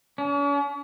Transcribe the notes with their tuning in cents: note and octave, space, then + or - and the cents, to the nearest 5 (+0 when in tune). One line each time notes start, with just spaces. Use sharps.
C#4 +45